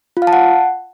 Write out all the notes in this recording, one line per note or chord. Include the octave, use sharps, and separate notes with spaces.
F4
F5
A5
F#5